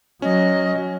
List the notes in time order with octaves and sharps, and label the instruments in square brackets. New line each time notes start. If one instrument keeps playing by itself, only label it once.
[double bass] F#3 [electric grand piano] C#4 [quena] D#5